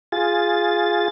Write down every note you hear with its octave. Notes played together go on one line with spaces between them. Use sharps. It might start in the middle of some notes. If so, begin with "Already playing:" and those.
F4 G#4 A6